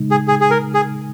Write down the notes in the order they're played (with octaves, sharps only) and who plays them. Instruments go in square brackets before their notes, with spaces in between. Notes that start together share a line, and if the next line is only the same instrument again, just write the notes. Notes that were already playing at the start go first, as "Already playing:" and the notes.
Already playing: [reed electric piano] C#3 G#3 D#4
[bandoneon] G#4
G#4
G#4
A#4
G#4